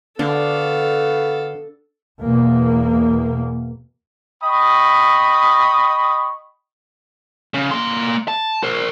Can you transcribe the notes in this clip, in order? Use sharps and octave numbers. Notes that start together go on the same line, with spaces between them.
D3 B3 D4 F#4 A4 F5
E2 B2 A#3
D#5 G5 B5 C#6 D#6
C#3
A#3 C6
A5
A#4 C5